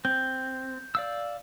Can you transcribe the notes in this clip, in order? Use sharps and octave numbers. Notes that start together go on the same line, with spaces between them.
C4 G6
D5 F5 E6